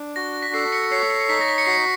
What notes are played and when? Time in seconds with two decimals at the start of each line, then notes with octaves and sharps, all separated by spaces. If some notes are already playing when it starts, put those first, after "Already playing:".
Already playing: D4
0.16 F#4 A#6
0.43 B6
0.54 A4 C7
0.72 B6 C#7
0.91 C#5 C7
1.10 C7
1.24 C7
1.29 D#4 B6
1.41 A#6
1.48 B6
1.58 C#7
1.66 F#4 C7